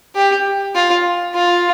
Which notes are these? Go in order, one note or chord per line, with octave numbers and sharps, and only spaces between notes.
G4
F4
F4